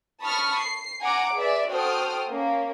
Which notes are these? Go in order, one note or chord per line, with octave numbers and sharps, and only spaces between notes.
A5 B5 C#6 D#6 F6
C7
F#5 G#5 A#5 D6
G#4 B4 D5 E5
F#4 A4 C5 G5 D#6 F6
A#3 C#4